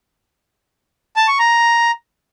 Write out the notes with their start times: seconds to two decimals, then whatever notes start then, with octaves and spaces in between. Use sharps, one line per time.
1.16 A5
1.28 C#6
1.39 A#5